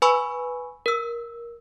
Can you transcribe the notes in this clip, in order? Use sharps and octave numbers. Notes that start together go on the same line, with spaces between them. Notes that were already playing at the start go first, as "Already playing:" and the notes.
B4 G#5 B5 C#6 E6
A#4 E6